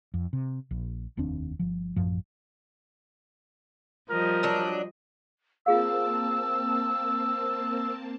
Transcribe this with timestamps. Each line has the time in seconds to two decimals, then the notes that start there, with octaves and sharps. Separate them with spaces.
0.14 F2
0.33 C3
0.71 A#1
1.17 F1 D#2 C4 D4
1.59 G1 F3
1.96 A1 F#2 F3
4.10 F3 G3 A#4 D#5
4.43 F#3 D4
5.66 A#3 C4 F4 G#4 F5 A5 E6